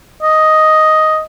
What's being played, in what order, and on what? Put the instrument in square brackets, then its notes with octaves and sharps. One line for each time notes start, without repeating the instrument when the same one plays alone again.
[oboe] D#5